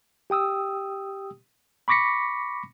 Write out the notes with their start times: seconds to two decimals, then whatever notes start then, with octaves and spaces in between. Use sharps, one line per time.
0.30 G4 G5 D#6 E6
1.88 B5 C#6 D6 A#6 B6 C#7